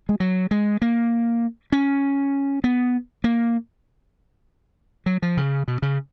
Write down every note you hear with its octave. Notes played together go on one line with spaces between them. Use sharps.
G#3
F#3
G#3
A#3
C#4
B3
A#3
F#3
F3
C#3
B2
C#3